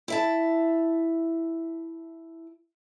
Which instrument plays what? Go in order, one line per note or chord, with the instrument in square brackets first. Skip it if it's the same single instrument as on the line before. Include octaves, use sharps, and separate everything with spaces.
[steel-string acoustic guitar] E4 E5 A5